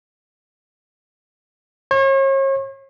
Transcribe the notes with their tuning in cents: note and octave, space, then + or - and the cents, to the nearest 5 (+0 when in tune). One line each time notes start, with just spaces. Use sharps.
C#5 -40